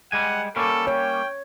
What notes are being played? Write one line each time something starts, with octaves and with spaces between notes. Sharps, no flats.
G3 G#3 F#5 G#5
G3 A#3 C#4 A4
C#5 G5